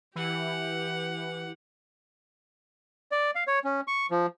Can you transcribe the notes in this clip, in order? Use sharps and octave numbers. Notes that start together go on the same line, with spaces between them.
E3 G4 F#5
D5
F5
C#5
C#4
C#6
F3